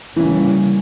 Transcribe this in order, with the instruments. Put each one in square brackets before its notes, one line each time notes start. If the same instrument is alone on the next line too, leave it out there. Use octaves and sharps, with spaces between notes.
[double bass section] C#3 G3 A#3 C#4 [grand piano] E3